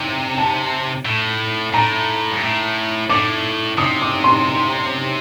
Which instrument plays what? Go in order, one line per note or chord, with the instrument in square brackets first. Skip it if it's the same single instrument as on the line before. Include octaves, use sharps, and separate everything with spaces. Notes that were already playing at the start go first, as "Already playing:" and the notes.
Already playing: [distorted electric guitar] C3 [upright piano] D6
[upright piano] A5
[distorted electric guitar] A2
[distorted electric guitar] A2 [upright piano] A#5
[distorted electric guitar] G2
A2
[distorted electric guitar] A2 [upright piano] D6
[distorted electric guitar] C3 [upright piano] D#6
[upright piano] D6
C6